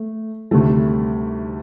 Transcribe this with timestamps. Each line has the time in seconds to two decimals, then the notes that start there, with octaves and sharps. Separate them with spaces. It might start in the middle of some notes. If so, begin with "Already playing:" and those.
Already playing: A3
0.51 D2 C3 D#3 G3 A3